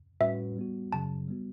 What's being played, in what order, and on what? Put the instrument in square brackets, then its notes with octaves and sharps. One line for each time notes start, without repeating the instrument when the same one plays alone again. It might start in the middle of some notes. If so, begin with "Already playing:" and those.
[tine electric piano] A2 G3 C#4 F#4 B4 [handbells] E5
[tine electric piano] G3 B3 F#4
[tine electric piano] F#2 C#3 F#3 [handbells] A5
[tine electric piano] G3 B3 F#4